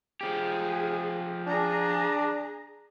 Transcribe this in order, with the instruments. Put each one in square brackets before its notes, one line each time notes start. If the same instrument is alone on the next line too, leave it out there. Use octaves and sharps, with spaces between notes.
[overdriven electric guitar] F3 G4 [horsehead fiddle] G#4
[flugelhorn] D4 [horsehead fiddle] G#4 A#5